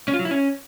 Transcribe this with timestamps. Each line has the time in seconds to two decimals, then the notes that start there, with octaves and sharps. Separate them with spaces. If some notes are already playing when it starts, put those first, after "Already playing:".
0.08 C#4
0.14 F4
0.19 F#3
0.25 E4
0.31 C#4